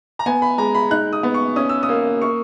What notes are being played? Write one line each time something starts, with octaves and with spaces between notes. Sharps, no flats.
A#5
B3 G#5
B5
G#3 A#5
B5
D#4 F#6
D#6
B3
C#6
C#4 D#6
E6
D#6
A#3
A#3 C#6